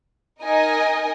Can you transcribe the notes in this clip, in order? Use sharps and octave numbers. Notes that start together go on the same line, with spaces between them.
D#4 A#4 D#5 G#5